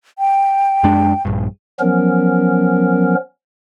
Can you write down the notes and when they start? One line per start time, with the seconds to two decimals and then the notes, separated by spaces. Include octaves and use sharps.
0.19 G5
0.83 F#2 G#3 D4
1.25 A#1 G2
1.80 F3 F#3 B3 C#4 A#4